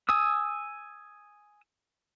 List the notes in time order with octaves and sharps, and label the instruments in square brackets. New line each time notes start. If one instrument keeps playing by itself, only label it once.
[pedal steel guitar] G#5 D#6 E6